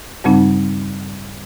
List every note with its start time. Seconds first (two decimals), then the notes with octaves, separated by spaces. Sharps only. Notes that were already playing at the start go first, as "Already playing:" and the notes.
0.24 G2 C#3 G3 C4 D#4